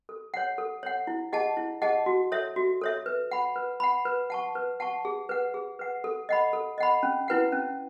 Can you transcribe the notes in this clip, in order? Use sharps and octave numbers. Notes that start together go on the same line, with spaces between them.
A4
C#5 F#5
A4
C#5 F#5
E4
G#4 D#5 F#5 A5
E4
G#4 D#5 F#5 A5
F#4
A4 C#5 E5
F#4
A4 C#5 E5
B4
F#5 B5
B4
F#5 B5
B4
F#5 A5 C#6
B4
F#5 A5 C#6
G#4
B4 F#5
G#4
B4 F#5
A4
D#5 F#5 B5
A4
D#5 F#5 B5
C#4
E4 B4 F#5
C#4